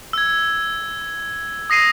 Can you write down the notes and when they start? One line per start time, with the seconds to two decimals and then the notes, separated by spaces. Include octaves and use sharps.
0.13 E6 G#6
1.70 D#6 A#6 C7 D#7